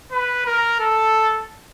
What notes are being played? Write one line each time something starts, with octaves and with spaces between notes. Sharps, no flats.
B4
A#4
A4